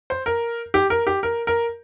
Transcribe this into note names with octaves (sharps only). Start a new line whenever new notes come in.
C5
A#4
G4
A#4
G4
A#4
A#4